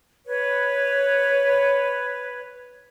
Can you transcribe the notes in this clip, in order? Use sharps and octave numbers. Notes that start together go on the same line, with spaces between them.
B4 C#5